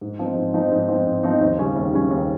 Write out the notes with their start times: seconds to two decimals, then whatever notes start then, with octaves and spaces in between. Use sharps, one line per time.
0.01 G#2
0.19 F3 C4 D#4
0.36 G#2
0.54 F3 C4 D#4
0.71 G#2
0.88 F3 C4 D#4
1.06 G#2
1.23 F3 C4 D#4
1.41 D#2
1.59 C#3 G3 C#4
1.76 D#2
1.94 C#3 G3 C#4
2.11 D#2